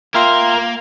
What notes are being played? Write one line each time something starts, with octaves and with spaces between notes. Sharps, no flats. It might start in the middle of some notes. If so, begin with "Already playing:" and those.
A#3 F4 A#4 E5 G5 C6